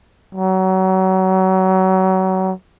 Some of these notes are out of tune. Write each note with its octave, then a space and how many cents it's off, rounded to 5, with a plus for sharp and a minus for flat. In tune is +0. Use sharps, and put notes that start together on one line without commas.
F#3 +30